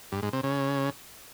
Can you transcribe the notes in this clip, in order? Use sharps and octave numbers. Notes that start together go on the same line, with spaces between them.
G2
G#2
C3
C#3